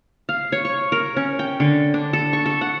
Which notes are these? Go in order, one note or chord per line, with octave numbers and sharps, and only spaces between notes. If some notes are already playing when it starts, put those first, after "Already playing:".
F5
C#5
C#6
A#4
C#4
G5
D3
D4
A4
C#6
A4
F#5